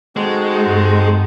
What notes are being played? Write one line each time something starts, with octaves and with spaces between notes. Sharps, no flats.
G#3 C4 D#4 F#4 A4
G2